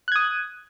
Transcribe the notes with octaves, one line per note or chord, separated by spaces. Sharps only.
D#6 F#6 G#6